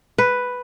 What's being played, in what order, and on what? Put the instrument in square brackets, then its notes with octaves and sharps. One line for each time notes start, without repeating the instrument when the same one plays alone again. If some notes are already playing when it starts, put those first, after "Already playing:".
[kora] B4